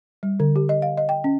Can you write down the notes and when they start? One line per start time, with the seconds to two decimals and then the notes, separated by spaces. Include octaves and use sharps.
0.23 G3
0.40 D3
0.56 G4
0.69 D#5
0.82 F5
0.97 D#5
1.09 G5
1.24 C#4